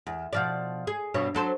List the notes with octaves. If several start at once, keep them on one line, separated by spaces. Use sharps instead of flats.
E2
B2 F3 D5
G#4
G2 B2 C#5
F#3 A4 C5